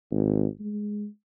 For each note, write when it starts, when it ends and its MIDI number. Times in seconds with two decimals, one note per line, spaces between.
0.11 0.46 32
0.60 1.07 56